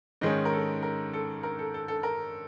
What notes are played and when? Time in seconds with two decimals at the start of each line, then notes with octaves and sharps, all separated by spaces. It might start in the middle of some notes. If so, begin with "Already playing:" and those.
0.21 G#2 D#3 G#3 C#4 D#5
0.45 A#4
0.53 A4
0.83 A#4
1.13 A4
1.43 A#4
1.59 A4
1.74 A4
1.88 A4
2.03 A#4